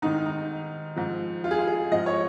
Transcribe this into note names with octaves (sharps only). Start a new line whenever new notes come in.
G#2 D#3 D#4
D#4
G#2 F3
F4
G#4
F4
G#4
G#2 F3 D#5
C#5